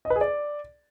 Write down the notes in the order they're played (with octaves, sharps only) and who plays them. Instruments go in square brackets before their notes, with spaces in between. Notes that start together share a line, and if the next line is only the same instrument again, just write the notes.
[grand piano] D#5
B4
G#4
D5